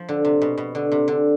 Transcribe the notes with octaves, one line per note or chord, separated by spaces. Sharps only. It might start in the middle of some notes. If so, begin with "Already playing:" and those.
Already playing: F3
D3
C3
B2
B2
D3
C3
D3